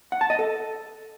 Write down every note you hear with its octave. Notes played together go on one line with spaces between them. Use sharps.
F#5
A5
D#5
A4